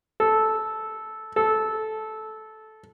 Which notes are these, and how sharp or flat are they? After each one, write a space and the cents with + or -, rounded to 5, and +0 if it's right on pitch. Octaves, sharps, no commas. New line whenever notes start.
A4 -10
A4 -15